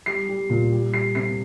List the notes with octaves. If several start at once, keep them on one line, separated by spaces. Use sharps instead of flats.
G3 C7
G3
A#2
G3
G3 C7
C3 C7